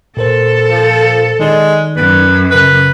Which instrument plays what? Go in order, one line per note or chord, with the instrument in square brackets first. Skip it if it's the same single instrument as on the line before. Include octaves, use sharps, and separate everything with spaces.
[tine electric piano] A#2 A#4 C5 [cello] A4
[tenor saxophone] F3
[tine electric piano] D#3 D#4 D5 [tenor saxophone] G#3
[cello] F#2 [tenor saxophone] B4
[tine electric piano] C#3 A#4 F#6 [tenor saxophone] B4